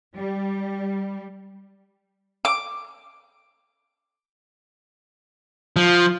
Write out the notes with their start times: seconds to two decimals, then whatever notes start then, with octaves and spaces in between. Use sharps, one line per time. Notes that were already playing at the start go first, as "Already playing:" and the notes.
0.17 G3
2.45 D6
5.76 F3